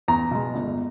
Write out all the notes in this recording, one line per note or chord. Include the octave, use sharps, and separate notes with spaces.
E2 A#5
B2 G#3
G1